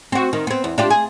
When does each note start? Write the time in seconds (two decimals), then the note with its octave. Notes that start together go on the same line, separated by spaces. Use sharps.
0.12 C4 F#4
0.33 D#3
0.47 B3 C4
0.64 E2
0.78 D4 F4 G4
0.90 G#4